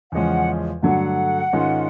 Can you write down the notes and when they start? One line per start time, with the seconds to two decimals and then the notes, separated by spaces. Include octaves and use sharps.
0.12 E2 C#3 F3 G#3 C#4 F#5
0.82 G2 D3 F#3 A3 F#5
1.53 G#2 D#3 G#3 C#4 F4